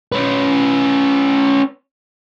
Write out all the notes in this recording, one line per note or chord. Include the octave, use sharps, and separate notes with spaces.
C#4 B4